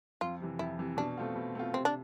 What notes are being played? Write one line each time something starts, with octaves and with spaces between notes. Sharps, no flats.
F2 F4
C3 E3
F2 E4
C3 E3
B2 D4
A3 C4 F4
B2
A3 C4 F4
C3 C4
D4